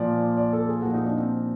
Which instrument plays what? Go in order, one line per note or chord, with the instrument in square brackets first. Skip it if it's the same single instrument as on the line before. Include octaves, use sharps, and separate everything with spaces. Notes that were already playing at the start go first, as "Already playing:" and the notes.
Already playing: [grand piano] A#2 F3 D5
D5
A4
G#4
A#2 F3 F#4
D#4
D4
C4